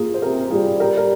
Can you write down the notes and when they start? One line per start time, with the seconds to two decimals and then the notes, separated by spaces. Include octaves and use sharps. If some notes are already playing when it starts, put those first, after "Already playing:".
Already playing: A#3 F4 G#4
0.14 C5
0.22 C3 G4 A#4
0.51 G3 F4 G#4
0.80 G4 A#4
0.97 A#4